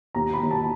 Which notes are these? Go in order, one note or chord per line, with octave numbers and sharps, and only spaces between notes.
D#2 A#5
B5
D#2
A5